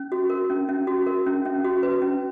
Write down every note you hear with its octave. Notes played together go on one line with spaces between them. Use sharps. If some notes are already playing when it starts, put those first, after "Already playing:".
Already playing: C#4
F#4
A#4
C#4
C#4
F#4
A#4
C#4
C#4
F#4
B4
C#4